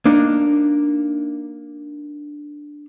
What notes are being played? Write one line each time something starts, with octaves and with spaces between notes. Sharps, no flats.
A#3 D4 D#4